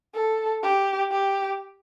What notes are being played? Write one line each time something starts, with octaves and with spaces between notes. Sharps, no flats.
A4
G4
G4